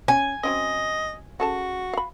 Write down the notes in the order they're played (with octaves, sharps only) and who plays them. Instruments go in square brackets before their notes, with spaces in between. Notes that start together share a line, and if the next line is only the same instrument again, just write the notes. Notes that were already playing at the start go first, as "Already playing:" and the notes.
[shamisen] C#4 [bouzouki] G#5
[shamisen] F#3 C4 C#4 [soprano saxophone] D#5
[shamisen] C#3 A4 A5 [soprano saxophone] F#4
[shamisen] F5 B5